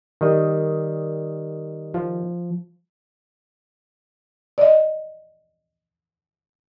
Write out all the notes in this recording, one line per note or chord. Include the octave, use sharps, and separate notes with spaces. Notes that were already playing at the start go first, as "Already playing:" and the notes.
D#3 G3 D#5
F3
D5 D#5